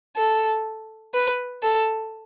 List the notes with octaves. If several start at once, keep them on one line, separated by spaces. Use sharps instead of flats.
A4
B4
A4